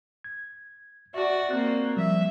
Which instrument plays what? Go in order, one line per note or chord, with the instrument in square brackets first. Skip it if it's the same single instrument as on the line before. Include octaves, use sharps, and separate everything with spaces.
[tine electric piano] G#6
[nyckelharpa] F#4 D5 [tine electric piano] E5 A5
[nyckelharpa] A#3 C4 [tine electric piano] F#6
[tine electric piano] F3 G3 [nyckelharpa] E5